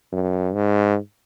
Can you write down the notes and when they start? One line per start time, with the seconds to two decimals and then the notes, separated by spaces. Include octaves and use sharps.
0.12 F#2
0.54 G#2